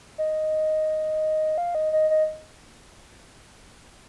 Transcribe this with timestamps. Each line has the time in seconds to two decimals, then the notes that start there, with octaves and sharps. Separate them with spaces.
0.18 D#5
1.58 F5
1.75 D#5
1.93 D#5
2.10 D#5